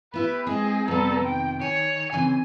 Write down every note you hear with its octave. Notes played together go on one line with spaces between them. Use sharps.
B3 E4 G4 B4
G#3 C4 G#4 D#5
F2 C3 G3 B3 A4 A#5
D#3 G5
C#5 G#5
C#3 E3 C4 G#5